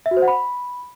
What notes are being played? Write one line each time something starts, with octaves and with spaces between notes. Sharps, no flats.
E5
F#4
C5
F#5
B5